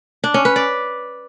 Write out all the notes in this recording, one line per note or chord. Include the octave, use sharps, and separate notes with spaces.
D4
C#4
B4
D5